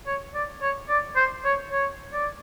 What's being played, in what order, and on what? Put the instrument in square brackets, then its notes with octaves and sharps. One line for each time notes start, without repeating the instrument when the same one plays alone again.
[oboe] C#5
D5
C#5
D5
C5
C#5
C#5
D5